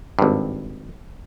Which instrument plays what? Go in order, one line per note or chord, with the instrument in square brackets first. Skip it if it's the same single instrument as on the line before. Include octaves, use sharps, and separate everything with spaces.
[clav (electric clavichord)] G#1 G2